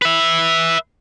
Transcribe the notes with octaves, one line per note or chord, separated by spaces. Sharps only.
B4 E5